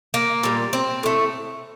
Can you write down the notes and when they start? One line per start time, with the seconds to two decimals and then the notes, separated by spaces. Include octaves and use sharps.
0.14 A#3
0.43 A#2 G3
0.73 C4
1.03 A2 A3